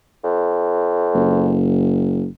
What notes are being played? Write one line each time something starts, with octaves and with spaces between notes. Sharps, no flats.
F2
F#1